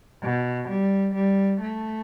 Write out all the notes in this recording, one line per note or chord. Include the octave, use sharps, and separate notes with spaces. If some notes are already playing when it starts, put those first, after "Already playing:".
B2
G3
G3
A3